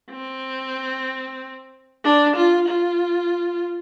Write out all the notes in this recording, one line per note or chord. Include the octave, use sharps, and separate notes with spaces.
C4
D4
F4
F4